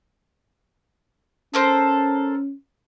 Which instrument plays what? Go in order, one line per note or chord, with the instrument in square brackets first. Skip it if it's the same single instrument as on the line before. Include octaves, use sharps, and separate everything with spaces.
[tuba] C#4 [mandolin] A4 A#4 C5